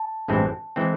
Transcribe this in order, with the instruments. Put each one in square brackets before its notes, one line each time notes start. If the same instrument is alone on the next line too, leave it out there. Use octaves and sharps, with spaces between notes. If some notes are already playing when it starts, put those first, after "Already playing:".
Already playing: [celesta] A5
[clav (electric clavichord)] A1 G2 E3 G#3 C4
E3 G#3 C4